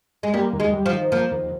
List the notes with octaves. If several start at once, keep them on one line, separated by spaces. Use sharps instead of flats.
G#3
G3 A#3
D#2
G#3
G3
F3
D#3
F3 A#3
D#2